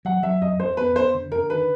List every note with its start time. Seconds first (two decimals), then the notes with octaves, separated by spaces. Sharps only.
0.05 F#3 F#5
0.23 F#3 E5
0.41 F2 D#5
0.59 F2 C5
0.77 B3 B4
0.96 F2 C5
1.14 D3
1.32 D3 A#4
1.50 D#3 B4